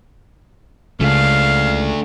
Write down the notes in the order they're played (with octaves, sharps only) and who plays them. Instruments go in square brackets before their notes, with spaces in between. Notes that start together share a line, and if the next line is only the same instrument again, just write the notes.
[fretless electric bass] C#2 [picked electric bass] C#3 [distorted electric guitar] A3 D4 [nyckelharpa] F5